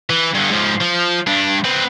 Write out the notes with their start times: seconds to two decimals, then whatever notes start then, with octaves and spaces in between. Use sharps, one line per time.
0.10 E3
0.34 G2 D3
0.50 G#2 F3
0.81 F3
1.27 G2 D4
1.65 C4 B4